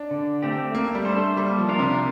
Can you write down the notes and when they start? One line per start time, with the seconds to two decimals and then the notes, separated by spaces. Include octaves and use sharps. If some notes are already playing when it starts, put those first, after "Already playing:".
Already playing: D4
0.11 D3
0.43 A3 C4 G4
0.74 A3 A#3
0.95 G3
1.05 D4 A4 C5
1.16 A3
1.37 G3 A#3
1.58 F3
1.68 D4 F4 A#4
1.79 C3